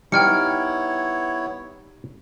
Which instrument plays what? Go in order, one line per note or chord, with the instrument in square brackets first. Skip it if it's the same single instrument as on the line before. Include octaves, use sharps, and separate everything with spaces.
[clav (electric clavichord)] G3 D#4 [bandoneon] B3 E4 C#5 [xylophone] G5 F6 C#7